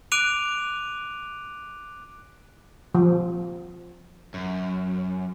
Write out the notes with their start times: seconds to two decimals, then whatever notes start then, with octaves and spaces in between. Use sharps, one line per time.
0.12 D6 F#6 D7 D#7 F7
2.95 F3
4.34 F#2